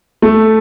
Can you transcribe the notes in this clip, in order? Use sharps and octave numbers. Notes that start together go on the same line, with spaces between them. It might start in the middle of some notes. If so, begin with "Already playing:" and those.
A3